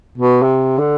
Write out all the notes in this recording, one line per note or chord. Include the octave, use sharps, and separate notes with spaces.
B2
C3
D3